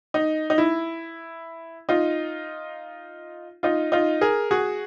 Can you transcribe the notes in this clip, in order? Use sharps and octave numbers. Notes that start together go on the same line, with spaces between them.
D#4
D#4
E4
D#4 F4
D#4 F4
D#4 F4
G#4 A#4
F#4 G#4